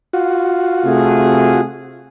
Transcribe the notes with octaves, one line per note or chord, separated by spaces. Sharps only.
F4 F#4
C3 A3 G#4